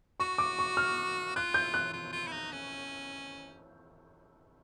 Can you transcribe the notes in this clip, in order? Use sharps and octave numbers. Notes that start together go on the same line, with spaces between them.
F#4 C#6
D6
C#6
F6
F4 F#6
G6
F#6
F4
F4
E4
D#4
C#4